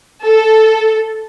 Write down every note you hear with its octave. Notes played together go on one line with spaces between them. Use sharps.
A4